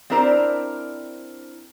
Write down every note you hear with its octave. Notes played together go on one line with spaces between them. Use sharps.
C4 D4 E4 A#4 C5 D5